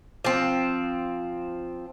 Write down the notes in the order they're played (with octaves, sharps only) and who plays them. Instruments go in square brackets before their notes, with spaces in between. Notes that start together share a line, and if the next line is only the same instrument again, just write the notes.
[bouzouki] F3 C4